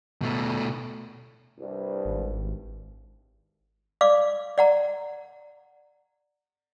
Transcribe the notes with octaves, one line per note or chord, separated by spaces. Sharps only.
B2 A3
C2 G2
G#1
D5 F5 D6
D5 F#5 A#5